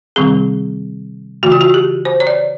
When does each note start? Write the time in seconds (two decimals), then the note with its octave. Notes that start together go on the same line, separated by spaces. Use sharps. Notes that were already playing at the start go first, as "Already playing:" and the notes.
0.16 C3 D#3 G3 C4 G#4
1.43 C#3 E3 A3 F#4
1.52 F4
1.61 F#4
1.74 G4
2.05 C5
2.20 C#5
2.27 D5